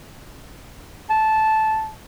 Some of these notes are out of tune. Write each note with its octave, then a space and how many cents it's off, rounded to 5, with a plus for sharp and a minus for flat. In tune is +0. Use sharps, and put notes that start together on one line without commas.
A5 -10